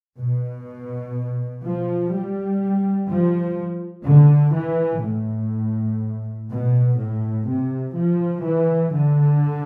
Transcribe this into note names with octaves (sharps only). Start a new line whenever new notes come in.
B2
F3
G3
F3
D3
E3
A2
B2
A2
C3
F3
E3
D3